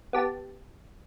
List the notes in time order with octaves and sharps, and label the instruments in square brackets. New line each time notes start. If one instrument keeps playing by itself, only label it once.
[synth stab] B3 G4 A5